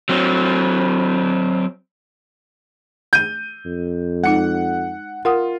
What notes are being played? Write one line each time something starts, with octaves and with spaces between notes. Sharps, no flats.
F#3 C4
G6 D#7
F2
G#3 D#4 F#5 C#7
F4 A#4 F#5 D#6